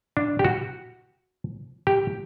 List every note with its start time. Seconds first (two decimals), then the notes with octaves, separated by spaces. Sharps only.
0.17 D4
0.39 G4
0.45 F#4
1.87 G4